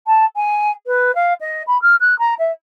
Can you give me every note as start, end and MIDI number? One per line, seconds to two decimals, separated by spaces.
0.07 0.25 81
0.36 0.71 80
0.86 1.14 71
1.15 1.34 77
1.41 1.62 75
1.67 1.80 83
1.82 1.96 89
2.00 2.17 90
2.19 2.34 82
2.39 2.52 76